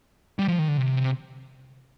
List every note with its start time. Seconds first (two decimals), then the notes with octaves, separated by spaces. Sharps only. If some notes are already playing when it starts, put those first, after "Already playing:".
0.39 G3
0.48 F3
0.59 D#3
0.68 D3
0.77 C3